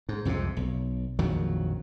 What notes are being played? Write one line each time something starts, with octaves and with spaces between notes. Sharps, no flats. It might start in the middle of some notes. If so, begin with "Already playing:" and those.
G#2
C2 F2 G#2 C3
B1
A#1 F2 D#3 F#3